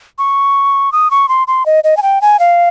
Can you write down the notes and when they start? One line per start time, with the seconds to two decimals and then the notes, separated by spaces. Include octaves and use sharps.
0.18 C#6
0.92 D#6
1.11 C#6
1.29 C6
1.47 C6
1.66 D#5
1.84 D#5
1.97 G#5
2.03 G5
2.22 G#5
2.39 F5